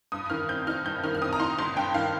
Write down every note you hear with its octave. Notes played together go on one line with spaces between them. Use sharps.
G2 D#6
D#3 F6
C4 G6
D#4 F6
G2 G6
D#3 F6
F6
C4 D#6
A#5
D#4 C6
G1 C6
G2 G5
D#3 F5